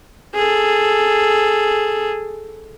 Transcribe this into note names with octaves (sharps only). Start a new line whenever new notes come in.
G#4 A4